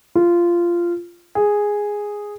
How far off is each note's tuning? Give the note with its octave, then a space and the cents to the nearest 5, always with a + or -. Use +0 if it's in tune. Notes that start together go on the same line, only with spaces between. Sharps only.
F4 -15
G#4 -5